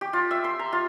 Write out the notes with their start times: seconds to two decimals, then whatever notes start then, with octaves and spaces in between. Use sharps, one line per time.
0.01 G4
0.13 F4
0.31 E5
0.44 C6
0.59 A#5
0.72 F4